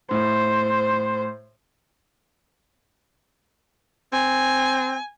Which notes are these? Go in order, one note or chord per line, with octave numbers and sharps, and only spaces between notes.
A2 C5
C4 G#5